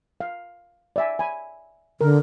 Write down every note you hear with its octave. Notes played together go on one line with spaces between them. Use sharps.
F5
D5 E5 G#5
G#5 B5
D3 A#4